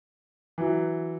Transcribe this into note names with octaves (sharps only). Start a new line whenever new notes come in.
E3 F#3